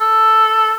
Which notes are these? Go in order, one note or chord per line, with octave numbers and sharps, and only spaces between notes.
A4